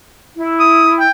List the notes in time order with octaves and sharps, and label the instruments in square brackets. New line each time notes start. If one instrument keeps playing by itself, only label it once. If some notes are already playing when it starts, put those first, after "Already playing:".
[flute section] E4
[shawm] D#6
G5